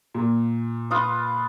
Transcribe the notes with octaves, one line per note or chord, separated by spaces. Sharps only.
A#2
F4 B4 D#6